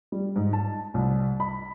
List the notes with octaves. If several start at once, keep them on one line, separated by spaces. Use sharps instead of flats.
G3
G#2
A5
C2
B5